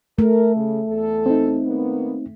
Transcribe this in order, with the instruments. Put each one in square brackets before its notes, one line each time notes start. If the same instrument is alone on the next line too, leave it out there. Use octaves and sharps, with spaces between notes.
[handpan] A3 [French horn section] A#4
[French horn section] C#3
E2 A4
[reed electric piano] C4 D#4
[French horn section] D#3 A#3 B3